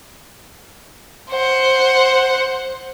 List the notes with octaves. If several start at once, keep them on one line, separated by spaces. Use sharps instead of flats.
C5 F#5